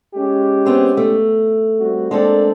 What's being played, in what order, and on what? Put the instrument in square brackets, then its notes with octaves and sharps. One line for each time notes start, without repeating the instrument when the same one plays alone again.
[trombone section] G#3 C#4 G4
[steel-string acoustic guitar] B3 C4 G#4
A3
[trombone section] G3 C4 F#4
[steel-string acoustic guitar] G#3 C4 A4 [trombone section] A#3 D4